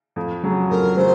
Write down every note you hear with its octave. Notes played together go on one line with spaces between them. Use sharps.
F2
C#3 F#3
F2 A#4
C#3 F#3 C5